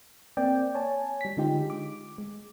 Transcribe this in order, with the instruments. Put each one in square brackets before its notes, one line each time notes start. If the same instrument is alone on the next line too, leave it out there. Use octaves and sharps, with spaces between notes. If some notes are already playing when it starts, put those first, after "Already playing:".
[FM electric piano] A#3 C4 D5 G5
C#5 G#5 A5
G3 B6
D3 G#3 D#4 F4 G4
D6
G#3